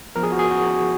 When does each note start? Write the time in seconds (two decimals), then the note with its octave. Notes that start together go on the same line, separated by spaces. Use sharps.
0.16 F3 B3 A#4
0.23 G#4
0.32 F#4
0.39 G#4
0.51 F#4